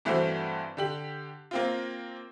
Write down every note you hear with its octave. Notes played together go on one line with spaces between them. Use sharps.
G2 E3 A3 C4 F#4 C5
D3 G4 F#7
A#3 C4 F4